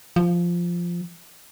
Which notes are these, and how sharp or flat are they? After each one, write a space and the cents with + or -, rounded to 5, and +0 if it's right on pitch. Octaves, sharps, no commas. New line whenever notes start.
F3 -5